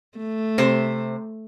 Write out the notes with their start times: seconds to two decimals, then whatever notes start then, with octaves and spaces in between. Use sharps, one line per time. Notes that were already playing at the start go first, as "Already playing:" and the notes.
0.18 A3
0.58 C3 C5